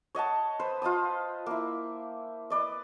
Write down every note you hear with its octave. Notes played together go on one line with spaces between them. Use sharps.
C#5 D#5 F#5 A5
B4 C5
F4 D#5 A5 D#6
A#3 E4
B4 D5 D#5